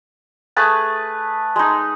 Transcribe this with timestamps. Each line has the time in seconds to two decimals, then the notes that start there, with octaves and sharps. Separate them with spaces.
0.56 A3 G#4 B4 A5
1.56 G#3 D#4